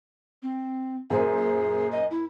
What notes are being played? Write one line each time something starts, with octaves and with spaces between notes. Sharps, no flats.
C4
F#2 A#2 G#4 C5
D#5
E4